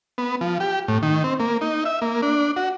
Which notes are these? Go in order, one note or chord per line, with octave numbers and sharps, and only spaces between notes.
B3
F3
G4
A2
D#3
C4
A#3
D#4
E5
A#3
D4
F#4